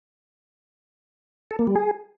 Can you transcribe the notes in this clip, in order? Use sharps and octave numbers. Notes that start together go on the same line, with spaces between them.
A4
A#3
G3
G#4